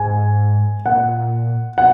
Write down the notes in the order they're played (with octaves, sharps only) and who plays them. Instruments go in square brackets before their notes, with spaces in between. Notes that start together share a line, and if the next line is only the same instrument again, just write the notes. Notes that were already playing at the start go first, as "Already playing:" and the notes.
Already playing: [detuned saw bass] G#2 [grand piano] G#5
[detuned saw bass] A#2 [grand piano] F#5
[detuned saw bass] B2 [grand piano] F#5